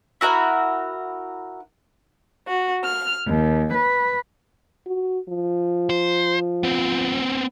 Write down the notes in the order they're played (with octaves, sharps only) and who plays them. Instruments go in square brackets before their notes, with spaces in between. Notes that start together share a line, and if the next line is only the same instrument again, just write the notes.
[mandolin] E4 F#4 A#4 E5
[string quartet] F#4
F6
D#2
B4
[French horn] F#4
F3
[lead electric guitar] C5
B3 C4